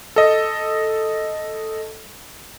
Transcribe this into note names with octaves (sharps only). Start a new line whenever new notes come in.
A4 D#5